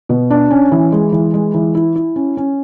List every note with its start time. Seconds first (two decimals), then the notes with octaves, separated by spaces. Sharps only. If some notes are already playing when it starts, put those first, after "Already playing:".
0.09 B2
0.30 D4
0.51 C#4
0.72 E3
0.92 G#3
1.12 E3
1.34 G#3
1.54 E3
1.75 E4
1.96 E4
2.16 C#4
2.37 C#4